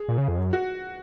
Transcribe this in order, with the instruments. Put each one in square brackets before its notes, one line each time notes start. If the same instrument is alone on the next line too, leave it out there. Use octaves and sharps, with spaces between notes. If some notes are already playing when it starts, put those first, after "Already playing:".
Already playing: [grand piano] G#4
[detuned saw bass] A#2
C#3
F2
F#2
[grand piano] F#4